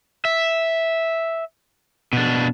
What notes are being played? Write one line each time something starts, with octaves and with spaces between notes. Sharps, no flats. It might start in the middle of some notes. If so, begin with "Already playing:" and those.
E5
B2 D4